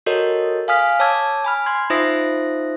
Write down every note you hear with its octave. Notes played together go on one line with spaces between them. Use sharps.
F#4 A4 A#4 C#5 D#5
F5 G#5 D#6 F6 B6
C#5 A5 D6 E6 G#6
G#5 B5 F6
C6 G#6
D#4 F4 C5 E5 D#6 A#6